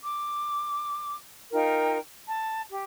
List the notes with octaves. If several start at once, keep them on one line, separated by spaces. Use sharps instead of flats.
D6
D#4 F4 A#4 G5
A5
G4